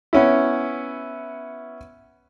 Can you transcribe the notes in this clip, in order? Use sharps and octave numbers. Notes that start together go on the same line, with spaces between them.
B3 C#4 E4